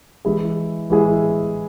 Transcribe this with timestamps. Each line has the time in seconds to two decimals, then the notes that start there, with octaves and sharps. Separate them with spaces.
0.25 E3 G#3 E4 G#4
0.90 E3 G#3 E4 G#4